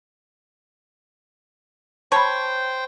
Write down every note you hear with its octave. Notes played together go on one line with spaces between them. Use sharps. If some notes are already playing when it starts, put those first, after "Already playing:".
C5 C#5 G5 A5 B5